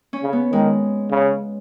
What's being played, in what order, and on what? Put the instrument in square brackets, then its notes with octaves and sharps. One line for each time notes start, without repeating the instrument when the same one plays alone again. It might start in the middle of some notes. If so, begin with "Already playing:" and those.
[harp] C#4
[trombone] C#3
[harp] B3
[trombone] D#3 [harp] G#3
[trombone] C#3